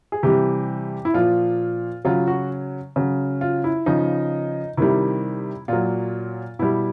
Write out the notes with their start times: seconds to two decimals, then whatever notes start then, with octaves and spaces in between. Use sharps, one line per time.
0.12 G#4
0.23 C3 E3 G3 G4
1.05 E4
1.14 A#2 F3 F4
2.05 C#3 F#3 F4
2.28 F#4
2.96 C#3 F#3
3.41 F4
3.64 E4
3.86 C#3 F3 D#4
4.77 C3 D#3 G3 E4
5.68 A#2 F#3 F4
6.59 B2 G3 E4